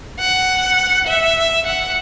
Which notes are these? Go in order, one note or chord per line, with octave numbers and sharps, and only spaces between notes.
F#5
E5
F#5